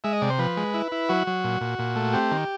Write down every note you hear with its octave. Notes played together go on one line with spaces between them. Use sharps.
G#3 E5
D#5
C3 D5
C5
F3 B4
G#3
E4
E4
F#3 F#4
F#3
A#2
A#2
A#2
A3
C4 G4
D#3